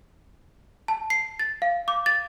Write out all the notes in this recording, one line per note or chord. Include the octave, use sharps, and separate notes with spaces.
A5
C7
A6
F5
D6
A6